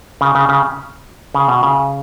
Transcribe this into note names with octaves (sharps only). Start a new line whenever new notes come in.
C#3
C#3
C#3
C#3
B2
C#3